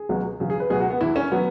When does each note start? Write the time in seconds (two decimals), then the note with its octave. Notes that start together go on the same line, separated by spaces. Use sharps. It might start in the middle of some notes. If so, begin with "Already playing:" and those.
Already playing: G#4
0.09 C#2 B2 F#3
0.40 E2 C#3 F#3
0.50 G#4
0.60 B4
0.70 C#2 B2 F#3 G#4
0.80 F#4
0.90 B3
1.01 E2 E3 E4
1.16 C#4
1.32 F#3 B3